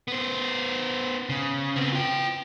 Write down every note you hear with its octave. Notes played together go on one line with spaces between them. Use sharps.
B3 C5
C#3
B3 C4
F4 G5